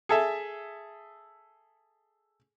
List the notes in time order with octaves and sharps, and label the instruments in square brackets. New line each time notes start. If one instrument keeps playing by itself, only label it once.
[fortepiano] G#4 A4 E5